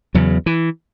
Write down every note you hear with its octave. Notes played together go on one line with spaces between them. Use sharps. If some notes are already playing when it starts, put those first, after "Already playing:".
E2 C#3 F#3
E3